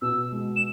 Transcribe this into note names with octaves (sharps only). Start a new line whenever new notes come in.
B2 E6
G#3
E7